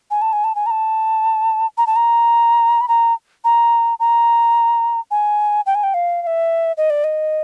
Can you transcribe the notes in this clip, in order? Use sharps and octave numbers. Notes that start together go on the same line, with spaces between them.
G#5
A5
G#5
A5
G#5
A#5
A5
A#5
A5
A#5
B5
A#5
A#5
A#5
G#5
G5
G#5
G5
F5
F5
E5
D#5
D5
D#5